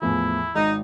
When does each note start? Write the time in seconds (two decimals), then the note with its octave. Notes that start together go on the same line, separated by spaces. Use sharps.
0.02 E2 A2 F3 E4
0.55 G#1 D#4